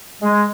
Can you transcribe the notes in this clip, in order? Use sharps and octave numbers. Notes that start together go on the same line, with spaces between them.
G#3